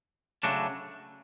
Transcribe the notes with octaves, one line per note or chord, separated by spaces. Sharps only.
C#3 F#3 A3 D4 F#4